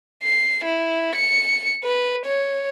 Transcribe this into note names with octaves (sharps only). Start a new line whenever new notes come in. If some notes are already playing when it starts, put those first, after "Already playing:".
C7
E4
C#7
B4
C#5